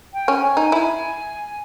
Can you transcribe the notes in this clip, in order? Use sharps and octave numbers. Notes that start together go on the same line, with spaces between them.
G5
C#4
G#5
D#4
E4 G#5